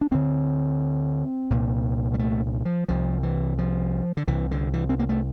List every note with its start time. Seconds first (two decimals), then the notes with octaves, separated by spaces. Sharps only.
0.01 D4
0.11 D2 D3 C4
1.50 C2 A#2
2.14 G3
2.19 A3
2.65 F3
2.88 C2 C3 F3
3.23 E3
3.58 F3
4.17 D3
4.28 C2 C3 E3
4.51 D3
4.73 E3
4.89 C4
4.99 A#3
5.09 A3